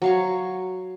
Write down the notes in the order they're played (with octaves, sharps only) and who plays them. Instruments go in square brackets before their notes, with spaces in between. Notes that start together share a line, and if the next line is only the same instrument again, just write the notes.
[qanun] F#3 F5 C#6